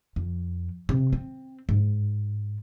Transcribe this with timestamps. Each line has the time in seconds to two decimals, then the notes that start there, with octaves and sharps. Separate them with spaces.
0.16 F2
0.89 C3
1.13 C4
1.69 G#2